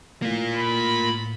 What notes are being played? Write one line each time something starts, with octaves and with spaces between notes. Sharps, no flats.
A2 A#3 F4
B5